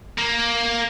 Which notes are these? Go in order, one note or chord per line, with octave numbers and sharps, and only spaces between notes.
A#3